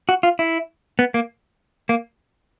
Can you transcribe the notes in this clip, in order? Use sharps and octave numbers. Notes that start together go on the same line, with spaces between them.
F#4
F4
E4
B3
A#3
A#3